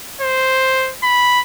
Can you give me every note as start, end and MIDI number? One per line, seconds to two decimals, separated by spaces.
0.21 0.92 72
1.03 1.41 83